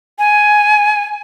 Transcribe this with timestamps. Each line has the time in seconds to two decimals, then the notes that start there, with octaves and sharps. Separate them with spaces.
0.19 G#5